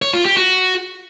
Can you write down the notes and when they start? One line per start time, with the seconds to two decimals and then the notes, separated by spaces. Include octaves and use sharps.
0.02 C#5
0.14 F4
0.25 G4
0.37 F#4